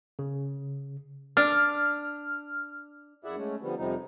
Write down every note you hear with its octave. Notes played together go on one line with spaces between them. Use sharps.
C#3
D4 F6
F#2 E4 G#4 D5 E5 F#5
G#3 A3 C#4
D3 F3 G3 B3
F2 C3 F3 G3 D#4